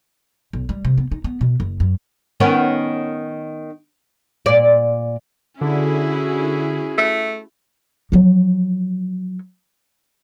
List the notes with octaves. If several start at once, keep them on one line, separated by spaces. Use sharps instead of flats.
B1
G3
C3
B3
D#4
B3
B2
F#1
F#2
D#3 B3 C#4
A#2 D5
D3 C#4 E4 F#4 G#4
A3
F3 F#3